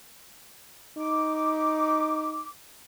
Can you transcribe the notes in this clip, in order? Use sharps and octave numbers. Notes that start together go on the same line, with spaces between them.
D#4 D6